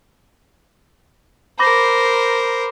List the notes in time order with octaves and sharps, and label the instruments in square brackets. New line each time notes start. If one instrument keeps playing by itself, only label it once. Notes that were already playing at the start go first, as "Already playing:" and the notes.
[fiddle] A#4 C5 [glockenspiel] B5 D6 A#6